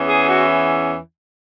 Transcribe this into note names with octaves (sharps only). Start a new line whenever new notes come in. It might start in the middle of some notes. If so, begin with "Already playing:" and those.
Already playing: E2 E3 C#4
G#4
F#4